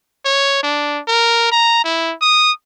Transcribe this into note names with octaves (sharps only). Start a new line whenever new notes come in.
C#5
D4
A#4
A#5
E4
D#6